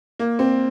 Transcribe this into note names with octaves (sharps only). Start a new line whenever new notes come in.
A#3
C4